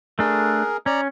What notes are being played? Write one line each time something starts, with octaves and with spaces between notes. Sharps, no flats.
A3 D4 G#4 A#4
C#4 D5 A#5